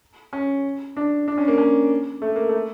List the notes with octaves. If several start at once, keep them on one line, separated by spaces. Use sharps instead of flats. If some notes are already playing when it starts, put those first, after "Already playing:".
C#4
D4
D4
C#4
A#3
C#4
A3
A#3
A3